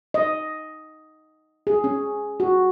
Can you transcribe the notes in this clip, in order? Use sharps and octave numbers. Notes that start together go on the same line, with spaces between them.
D#5
G#4
C#4
F#4